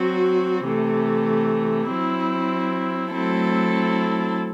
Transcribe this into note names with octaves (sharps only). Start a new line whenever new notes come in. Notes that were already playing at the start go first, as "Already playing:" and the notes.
Already playing: F#3 C4 F#4
C3 E3 A3
F#3 C4 E4
F#3 A3 C4 E4 A4